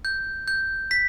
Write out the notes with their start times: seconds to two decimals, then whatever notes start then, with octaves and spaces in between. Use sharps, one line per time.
0.05 G6
0.48 G6
0.91 B6